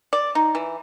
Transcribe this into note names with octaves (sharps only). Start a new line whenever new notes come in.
D5
D#4
E3